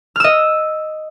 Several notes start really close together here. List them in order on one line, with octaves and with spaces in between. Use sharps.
F6 E6 D#5